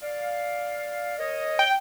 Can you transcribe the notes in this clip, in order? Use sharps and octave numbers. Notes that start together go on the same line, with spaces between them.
D5 F5
A#4 C#5 D#5
G5